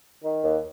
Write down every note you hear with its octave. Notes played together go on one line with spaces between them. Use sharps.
D#3
D#2